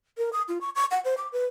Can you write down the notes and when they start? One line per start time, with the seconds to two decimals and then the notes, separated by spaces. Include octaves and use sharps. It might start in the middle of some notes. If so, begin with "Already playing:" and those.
0.18 A#4
0.33 D#6
0.48 F4
0.61 C#6
0.75 C#6
0.91 F#5
1.05 C5
1.17 D6
1.32 B4